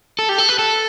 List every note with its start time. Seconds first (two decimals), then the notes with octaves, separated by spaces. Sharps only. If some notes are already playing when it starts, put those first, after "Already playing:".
0.19 A4
0.29 G4
0.38 A4
0.49 B4
0.59 A4